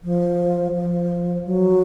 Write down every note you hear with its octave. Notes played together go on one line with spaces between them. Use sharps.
F3
F3
F#3